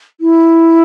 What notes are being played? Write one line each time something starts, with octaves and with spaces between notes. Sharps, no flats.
E4